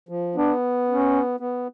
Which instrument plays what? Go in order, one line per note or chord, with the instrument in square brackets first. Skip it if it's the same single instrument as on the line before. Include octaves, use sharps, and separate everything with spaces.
[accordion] F3
[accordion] B3 [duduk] D4
[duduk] C#4
[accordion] B3